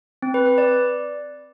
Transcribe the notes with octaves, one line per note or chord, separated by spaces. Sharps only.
C4
B4
B4
D5